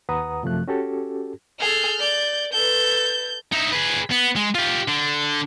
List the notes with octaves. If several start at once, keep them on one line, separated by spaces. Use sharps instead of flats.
D#2 B4 F#5 A#5 D#6
F#2 C3 F3 A3 F#6
C#4 F#4 G4 A4
G#4 A4 F6 G6
D5 G6
A4 B4 G6
D#4 E4
G#4 B4
B3
G#3
F4 G4
D3